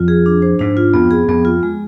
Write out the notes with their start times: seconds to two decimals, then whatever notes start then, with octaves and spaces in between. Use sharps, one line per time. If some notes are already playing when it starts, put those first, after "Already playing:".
Already playing: F2 F4
0.08 G#4
0.26 D4
0.42 C5
0.59 G#2 D4
0.77 F4
0.94 F2 B3
1.11 G#4
1.28 F2 B3
1.45 F4
1.63 G#3